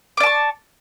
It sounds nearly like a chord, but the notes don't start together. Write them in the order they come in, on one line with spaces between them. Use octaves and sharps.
D6 D5 A5 C#6